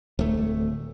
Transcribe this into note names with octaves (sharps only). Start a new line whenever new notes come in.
D1 A3